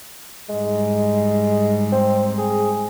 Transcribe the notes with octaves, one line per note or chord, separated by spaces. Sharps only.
G#2 G3 G#3
C4
G#4